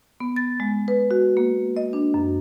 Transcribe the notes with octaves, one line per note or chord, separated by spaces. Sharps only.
B3
A6
G#3
B4
F#4
A#3
D#5
D4
F#2